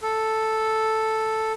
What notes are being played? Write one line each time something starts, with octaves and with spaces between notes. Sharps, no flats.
A4